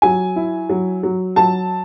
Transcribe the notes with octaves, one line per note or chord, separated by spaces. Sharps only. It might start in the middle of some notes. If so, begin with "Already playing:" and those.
F#3 G#5
E4
F#3
F#3
F#3 A5